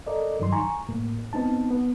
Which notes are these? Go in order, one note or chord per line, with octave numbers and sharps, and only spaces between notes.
A4 A#4 D5 D#5
G2 D#3 F#3 D#4 C6
G#5 A#5 C#6
A2 A#3
B3 C4 D#4 A5
B3